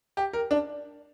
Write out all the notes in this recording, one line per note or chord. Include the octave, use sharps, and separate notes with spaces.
G4
A#4
D4